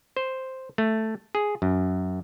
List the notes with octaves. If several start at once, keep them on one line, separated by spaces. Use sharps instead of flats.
C5
A3
G#4
F#2